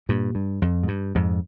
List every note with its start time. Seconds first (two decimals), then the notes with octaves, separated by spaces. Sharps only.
0.09 G2 A#2
0.35 G2
0.62 F2
0.83 G#2
0.88 G2
1.15 F2 G#2